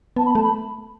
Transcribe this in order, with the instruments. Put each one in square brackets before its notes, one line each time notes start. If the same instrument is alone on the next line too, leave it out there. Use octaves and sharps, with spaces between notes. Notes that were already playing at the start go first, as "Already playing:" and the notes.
[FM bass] B3 [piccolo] A5
[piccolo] B5
[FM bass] A3 [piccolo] A5
[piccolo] B5